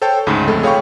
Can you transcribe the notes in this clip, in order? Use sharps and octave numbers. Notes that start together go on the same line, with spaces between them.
A4 C5 C#5 G5 A5
D2 G#2 C#3 B5
F2 G#3 A3 A4
G#4 C#5 F5 G5 B5 C#6